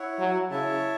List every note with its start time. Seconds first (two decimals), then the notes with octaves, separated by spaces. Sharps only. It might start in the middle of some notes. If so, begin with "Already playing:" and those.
Already playing: E4 C#5 F#5
0.19 F#3
0.51 C#3 E4 C#5 E5 A5